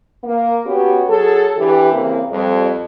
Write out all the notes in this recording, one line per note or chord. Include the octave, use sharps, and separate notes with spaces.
A#3
B3 C#4 F#4 G4
F#3 G#4 A4
D3 E3 G4
C#3 E3 A#3 C4
F2 G3